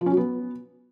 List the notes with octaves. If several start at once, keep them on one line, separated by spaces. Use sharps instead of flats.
F3
C#4
F#3
B3